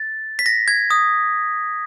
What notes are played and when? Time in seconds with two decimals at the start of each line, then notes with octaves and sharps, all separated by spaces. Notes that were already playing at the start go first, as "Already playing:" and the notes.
Already playing: A6
0.39 B6
0.46 A#6
0.68 G#6
0.91 D#6